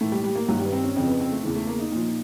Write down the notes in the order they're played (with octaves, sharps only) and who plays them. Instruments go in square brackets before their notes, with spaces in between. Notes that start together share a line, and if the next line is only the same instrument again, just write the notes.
[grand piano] A2 E3 A3
G3
G3
A#3
G2 D#3 F#3
G3
B3
C4
C#4
F2 C#3 F3 C4
B3
C4
A3
E2 C#3 E3
A3
A#3
D#4
A#2 F3